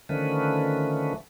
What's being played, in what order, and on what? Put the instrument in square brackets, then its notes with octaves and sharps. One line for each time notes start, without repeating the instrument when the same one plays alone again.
[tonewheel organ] D3 D#3 F3 A3 C#4 B4